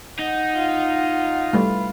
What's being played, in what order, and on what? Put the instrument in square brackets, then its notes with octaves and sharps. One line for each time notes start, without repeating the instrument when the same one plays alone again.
[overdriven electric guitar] D#4 [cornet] F#5
[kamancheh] F4
[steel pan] G3 A3 [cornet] B4